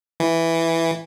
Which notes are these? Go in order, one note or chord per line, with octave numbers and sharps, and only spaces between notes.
E3